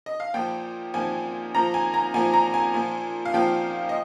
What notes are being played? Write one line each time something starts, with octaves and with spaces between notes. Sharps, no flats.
D#5
F5
A#2 F3 G5
A#2 F3 G#5
A#2 F3 A#5
G#5
A#5
A#2 F3 G#5
A#5
G#5
A#2 F3
F5
A#2 F3 G5
D#5